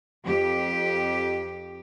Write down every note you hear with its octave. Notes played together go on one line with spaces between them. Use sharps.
F2 G4